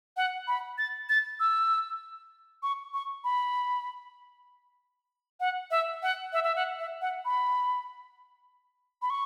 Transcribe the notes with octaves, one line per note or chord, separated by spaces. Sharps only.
F#5
B5
A6
A6
E6
C#6
C#6
B5
F#5
E5
F#5
E5
E5
F#5
E5
F#5
B5
B5
C#6